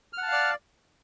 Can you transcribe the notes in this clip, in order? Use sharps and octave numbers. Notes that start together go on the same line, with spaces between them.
D5 F5 F#5 A5 F6